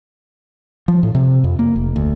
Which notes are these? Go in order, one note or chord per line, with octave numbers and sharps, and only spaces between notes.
F3
A2
C3
F2
A#3
F1
D2